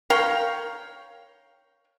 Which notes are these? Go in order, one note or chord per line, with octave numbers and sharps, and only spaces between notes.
A#4 C#5 F5 G5